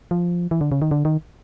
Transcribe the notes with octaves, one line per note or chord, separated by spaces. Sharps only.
F3
E3
D3
C#3
D#3
D3
D#3